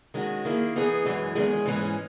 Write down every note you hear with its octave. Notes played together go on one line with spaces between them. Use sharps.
D#3 G#3 C#4 F#4
D#3 A#3 E4 G#4
E3 B3 D#4 G#4
F#2 E3 G#3
E2 D#3 G#3 C#4 G#4
G#2 E3 G#3 C#4